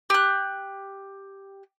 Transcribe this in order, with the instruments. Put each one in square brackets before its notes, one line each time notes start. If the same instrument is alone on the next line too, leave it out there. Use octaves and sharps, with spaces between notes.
[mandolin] G4 F#6